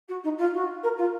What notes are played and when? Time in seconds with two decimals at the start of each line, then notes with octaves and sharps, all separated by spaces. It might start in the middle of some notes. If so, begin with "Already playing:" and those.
0.08 F#4
0.24 D#4
0.38 F4
0.53 F#4
0.83 A#4
0.98 F4